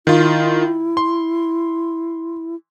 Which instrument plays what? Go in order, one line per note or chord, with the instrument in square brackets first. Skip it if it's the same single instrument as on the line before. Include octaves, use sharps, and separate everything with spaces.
[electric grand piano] D#3 F4 [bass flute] E4
[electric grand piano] C6